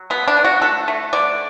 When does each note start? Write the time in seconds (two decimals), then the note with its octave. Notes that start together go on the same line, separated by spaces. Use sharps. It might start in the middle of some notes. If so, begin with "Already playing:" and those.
Already playing: F#3
0.10 B2 B3
0.28 D4
0.37 B2
0.44 F#4
0.62 A3 A4
0.88 A3
1.13 D3 D5